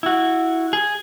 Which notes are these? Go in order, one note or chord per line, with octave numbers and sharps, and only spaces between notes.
E4 F#4
G#4